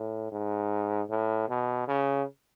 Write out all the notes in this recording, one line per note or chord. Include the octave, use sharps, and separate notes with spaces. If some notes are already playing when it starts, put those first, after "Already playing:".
Already playing: A2
G#2
A2
B2
C#3